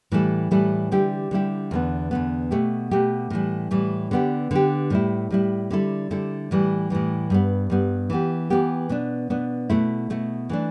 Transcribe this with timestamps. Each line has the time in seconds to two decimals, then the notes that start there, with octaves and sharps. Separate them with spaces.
0.11 A2 E3 G3 E4 A4
0.51 A2 E3 G3 E4 A4
0.92 D3 G3 E4 G4
1.31 D3 G3 E4 G4
1.71 E2 D3 B3
2.11 E2 D3 B3
2.51 B2 A3 G4
2.91 B2 A3 G4
3.30 A2 E3 G3
3.71 A2 E3 G3
4.11 D3 B3 G4
4.51 D3 B3 G4
4.90 A2 G3 E4
5.31 A2 G3 E4
5.71 D3 G3 E4 A4
6.11 D3 G3 E4 A4
6.51 A2 E3 G3
6.90 A2 E3 G3
7.30 G2 G3 B3
7.70 G2 G3 B3
8.10 E3 B3 G4
8.50 E3 B3 G4
8.89 B2 B3 D4
9.30 B2 B3 D4
9.70 B2 A3 E4
10.10 B2 A3 E4
10.49 E3 A3 D4